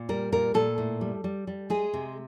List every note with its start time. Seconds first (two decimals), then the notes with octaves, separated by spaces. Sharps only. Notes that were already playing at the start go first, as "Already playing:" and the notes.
Already playing: A#2
0.09 G3 A#4
0.32 A#2 A#4
0.54 A#2 A4
0.78 A2
1.01 G3
1.24 G3
1.47 G3
1.70 G#3 G#4
1.93 C3